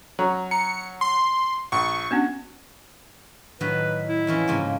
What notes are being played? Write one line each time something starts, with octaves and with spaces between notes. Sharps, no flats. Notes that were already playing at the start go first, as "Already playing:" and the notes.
F#3 C#4 A#5
A#5 C#7
C6
A#1 C#6
B3 C#4 D4 F#4
A2 D#3 F#3 B4
E4
F2 E3 C#4
G#2 C#3 A#3